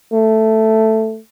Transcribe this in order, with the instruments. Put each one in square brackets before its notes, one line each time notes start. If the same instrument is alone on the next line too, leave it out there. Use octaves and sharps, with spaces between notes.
[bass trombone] A3